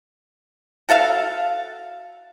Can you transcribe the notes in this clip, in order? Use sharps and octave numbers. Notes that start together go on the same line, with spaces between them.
F#4 A4 E5 F5